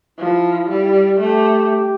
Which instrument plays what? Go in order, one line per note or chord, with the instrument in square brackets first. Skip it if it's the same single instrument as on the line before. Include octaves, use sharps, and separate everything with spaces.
[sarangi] F3 [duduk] E4
[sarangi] G3
[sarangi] A3 [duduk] G4
[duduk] G4